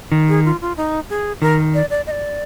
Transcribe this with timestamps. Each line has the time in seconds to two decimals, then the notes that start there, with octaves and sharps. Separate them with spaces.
0.12 D#3
0.29 G#4
0.45 F4
0.61 F4
0.77 D#4
1.10 G#4
1.42 D#3 A#4
1.74 D5
1.90 D5
2.07 D#5
2.11 D5